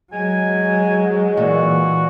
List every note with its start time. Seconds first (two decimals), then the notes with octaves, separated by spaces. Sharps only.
0.12 F#3 G#3 G#5
1.37 A#2 E3 F#4